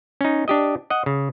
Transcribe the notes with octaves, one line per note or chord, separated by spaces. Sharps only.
C#4 D#4
D4 G4 D#5
D#5 F#5
C#3